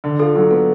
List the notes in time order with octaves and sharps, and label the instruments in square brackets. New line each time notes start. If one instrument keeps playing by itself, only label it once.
[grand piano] D3
[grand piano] F4 [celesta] A4
[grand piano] F#3 [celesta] A4
[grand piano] B3 [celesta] A4